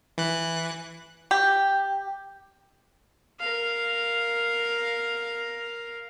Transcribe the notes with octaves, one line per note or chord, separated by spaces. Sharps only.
E3 F#6
G4
A#4 F5